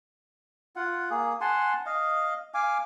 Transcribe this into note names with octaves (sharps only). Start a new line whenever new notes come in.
F4 F#5
A#3 G#4
F#5 G#5 A5 C6
D#5 F5
F5 G#5 D6